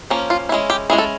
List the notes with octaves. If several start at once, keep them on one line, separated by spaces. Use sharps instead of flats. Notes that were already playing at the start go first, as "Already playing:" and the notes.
F3 A#3 C#4
F4
G#3 C#4 E4
G4
G#3 C#4 E4 G#4
A4